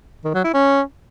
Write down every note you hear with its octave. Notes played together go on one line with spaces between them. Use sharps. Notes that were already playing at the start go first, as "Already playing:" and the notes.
D#3
F#3
E4
C#4